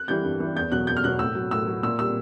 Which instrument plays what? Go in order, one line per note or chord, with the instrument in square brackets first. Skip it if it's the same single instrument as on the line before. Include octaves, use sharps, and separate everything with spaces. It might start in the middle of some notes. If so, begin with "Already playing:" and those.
Already playing: [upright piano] F#6
E3 G3 G6
G2
E3 G3
E2 G6
B2 F#3 F#6
E2 G6
F6
B2 F#3 F#6
A2 E6
F#3
A2 E6
F#3
A#2 E6
G3 E6